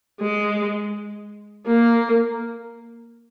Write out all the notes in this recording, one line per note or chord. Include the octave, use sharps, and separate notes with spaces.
G#3
A#3